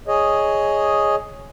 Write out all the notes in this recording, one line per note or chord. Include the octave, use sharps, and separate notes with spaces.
G#4 C#5 D#5